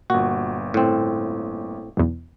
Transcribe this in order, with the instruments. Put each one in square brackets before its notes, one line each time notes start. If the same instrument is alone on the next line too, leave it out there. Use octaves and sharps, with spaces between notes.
[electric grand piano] G1 A#2 [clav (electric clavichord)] F#4
[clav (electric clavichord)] A2 C4
[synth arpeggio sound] B1 E2